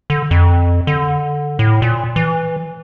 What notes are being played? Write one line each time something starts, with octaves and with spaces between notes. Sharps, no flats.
D3
F2
D3
A2
A#2
E3